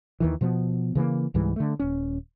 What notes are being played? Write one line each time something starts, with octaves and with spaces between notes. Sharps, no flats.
D#2 D#3 E3
B2 F3 G3 B3
C#3 E3 G3 A#3
C#2 G#2 E3 G3
D3 A3
D#1 C#4